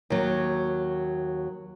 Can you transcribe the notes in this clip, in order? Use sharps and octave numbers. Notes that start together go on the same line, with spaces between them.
D#2 F#3